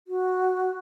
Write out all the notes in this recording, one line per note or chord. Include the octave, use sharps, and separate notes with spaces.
F#4